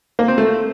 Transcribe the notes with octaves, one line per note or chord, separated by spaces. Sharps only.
A#3
C4
A3